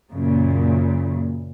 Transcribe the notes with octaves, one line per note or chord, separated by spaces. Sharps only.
F#2 A#2 C#3